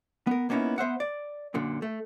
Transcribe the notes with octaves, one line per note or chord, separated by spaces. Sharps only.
B3 A#4
A#3 B3 C#4 D#4 E4
B3 C5 E5 F#5
D5
F#2 A#2 D3
A3